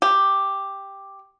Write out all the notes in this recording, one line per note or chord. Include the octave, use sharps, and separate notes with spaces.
G4